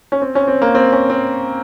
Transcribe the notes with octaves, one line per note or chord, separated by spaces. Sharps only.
C#4
C4
C#4
C4
A#3
C4
C#4
C4